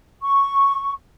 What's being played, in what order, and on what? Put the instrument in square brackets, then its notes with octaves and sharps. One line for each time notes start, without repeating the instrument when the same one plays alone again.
[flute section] C#6